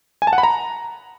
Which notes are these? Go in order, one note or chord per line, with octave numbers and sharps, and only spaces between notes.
G#5
A5
F#5
B5
A#5